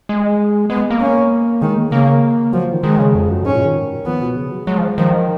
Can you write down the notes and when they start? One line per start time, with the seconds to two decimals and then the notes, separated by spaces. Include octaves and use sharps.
0.09 G#3
0.70 G#3 B3
0.90 A#3
1.01 C#4
1.61 D#3 G#3
1.77 A#3
1.91 C#3 A#3
2.53 F3 F#3
2.64 F3
2.73 D#3
2.83 D#3 G#3
2.99 C#3
3.15 F2
3.30 F#2
3.44 G#2 C#4
3.55 A#2
3.65 D#3
4.06 F3 B3
4.21 B2
4.36 C#3
4.52 F#3
4.67 F#3 G#3
4.77 F3
4.98 D#3 F3